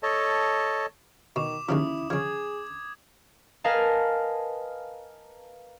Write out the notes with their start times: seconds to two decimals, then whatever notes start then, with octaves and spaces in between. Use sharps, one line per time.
0.03 A4 C#5 D#5 A5
1.36 B2 D#3 D6 E7
1.69 D#2 C#3 F3 C#4 E4 D#6
2.10 C#3 F3 G#4 G#6
3.64 A#4 B4 D#5 F5 G#5 A5